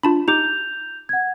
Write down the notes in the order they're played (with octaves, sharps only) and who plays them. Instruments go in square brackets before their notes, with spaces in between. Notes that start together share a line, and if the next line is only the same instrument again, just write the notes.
[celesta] D4 [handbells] F4 A5 B5
[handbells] D#4 G4 D6 [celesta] G6 F7
[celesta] F#5 G#6